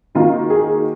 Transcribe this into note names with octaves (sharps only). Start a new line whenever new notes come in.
D#3 A#3 D#4 F4 F#4
G#4